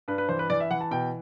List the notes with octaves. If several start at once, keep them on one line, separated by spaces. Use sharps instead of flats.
G2 B4
B4
E3 C5
B4
E3 D5
E5
E3 F#5
A5
B2 G5